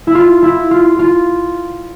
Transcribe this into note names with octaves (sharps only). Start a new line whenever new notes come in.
E4
F4
E4
F4
F4